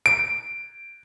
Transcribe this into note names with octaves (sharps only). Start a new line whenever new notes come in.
D7